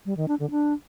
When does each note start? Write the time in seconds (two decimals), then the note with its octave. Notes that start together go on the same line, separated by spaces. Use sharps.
0.06 G3
0.17 D#3
0.28 D4
0.39 D3
0.51 D4